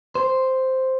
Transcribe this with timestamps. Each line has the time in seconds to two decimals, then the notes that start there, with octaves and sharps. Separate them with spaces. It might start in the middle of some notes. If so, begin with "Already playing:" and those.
0.15 C5